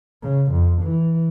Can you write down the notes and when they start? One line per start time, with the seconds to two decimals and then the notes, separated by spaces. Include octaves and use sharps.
0.23 C#3
0.52 F2
0.83 E3